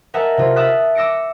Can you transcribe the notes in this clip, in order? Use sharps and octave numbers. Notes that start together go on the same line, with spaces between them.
A#4 D#5 E5 F#5 G#5 A5
C3 F4
E5 A5 D#6 F#6 B6
D6 E6 A#6 C#7 D7